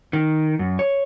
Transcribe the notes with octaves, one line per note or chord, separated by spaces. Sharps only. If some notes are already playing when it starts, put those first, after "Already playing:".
D#3
F#2
C#5